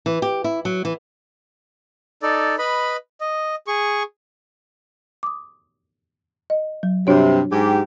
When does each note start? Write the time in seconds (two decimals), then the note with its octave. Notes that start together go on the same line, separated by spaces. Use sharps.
0.06 E3
0.22 G4
0.44 E4
0.65 F#3
0.85 E3
2.23 D#4 A4 D5
2.59 B4 D#5 B5
3.21 D#5
3.67 G#4 C#6
5.23 D6 D#6
6.50 D#5
6.83 F#3
7.07 G2 C3 D4 F#4 C#5
7.52 G#2 G4